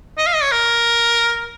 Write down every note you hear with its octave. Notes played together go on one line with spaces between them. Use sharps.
D#5
F5
D#5
C#5
A#4